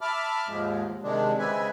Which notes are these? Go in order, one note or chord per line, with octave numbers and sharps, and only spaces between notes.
E5 A5 B5 D6 F6
D#2 G#2 F3 G#3
C3 D#3 G#3 D4
C#3 G#3 C4 B4 E5 G#5